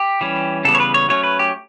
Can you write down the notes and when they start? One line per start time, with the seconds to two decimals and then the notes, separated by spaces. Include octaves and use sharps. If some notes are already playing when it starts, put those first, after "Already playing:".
Already playing: G4
0.21 E3 G3 C#4
0.65 C#3 E3 G3 B3 A4
0.75 C#5
0.80 B4
0.94 C#5
1.09 F#3 A3 C#4 C#5
1.24 B4
1.39 G4